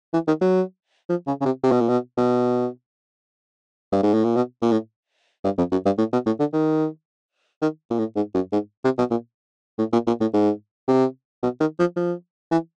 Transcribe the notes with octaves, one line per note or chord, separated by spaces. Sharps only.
E3
D#3
F#3
F3
C#3
C#3
C3
C3
B2
A#2
B2
B2
G2
G#2
A2
A#2
B2
A#2
A2
G2
F2
F#2
G2
A2
B2
A2
D3
D#3
D#3
A#2
A2
G#2
F#2
G#2
C3
B2
A#2
A2
A#2
A#2
A2
G#2
C3
B2
D#3
F3
F3
E3